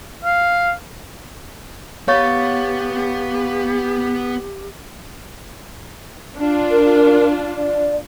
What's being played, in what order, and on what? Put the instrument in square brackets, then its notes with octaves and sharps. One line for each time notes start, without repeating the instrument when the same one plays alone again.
[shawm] F5
[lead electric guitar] B3 B4 [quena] G4 [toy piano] C#5 [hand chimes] F5 C#6 A6
[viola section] D4 F4
[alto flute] A#4
D5